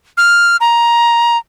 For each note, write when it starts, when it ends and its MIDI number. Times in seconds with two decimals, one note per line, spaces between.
0.17 0.57 89
0.61 1.37 82